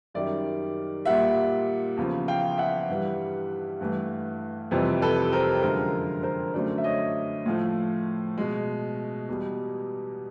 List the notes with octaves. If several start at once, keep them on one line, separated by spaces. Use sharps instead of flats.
F#2 D#3 G3 D5 E5
A#2 G3 E5 F#5
E2 C#3 F3
F5 G5
E5 F#5
G2 E3 G3
G2 E3 A3
F2 C3 E3 G3
A4 B4
A#4 C5
F#2 D3 F3 G#3 A#4
A#4 C5
F#2 D3 F#3 A3 C5 D5
E5
C#5 D#5
A2 F3 A3
B2 G#3
E2 B2 G3